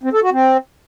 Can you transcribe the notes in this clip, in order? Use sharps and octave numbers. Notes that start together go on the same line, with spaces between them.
C4
A4
F#4
C4